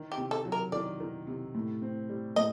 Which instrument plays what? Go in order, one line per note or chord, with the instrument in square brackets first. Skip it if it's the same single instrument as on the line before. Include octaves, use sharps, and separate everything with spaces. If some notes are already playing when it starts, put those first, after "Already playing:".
Already playing: [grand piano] D#3
[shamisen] G4
[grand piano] C3
[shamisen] A4
[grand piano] F#3
[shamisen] A#4
[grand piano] D#3 [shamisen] D5
[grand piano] D#3
C3
A2
C4
G3
[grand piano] A2 [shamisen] D#5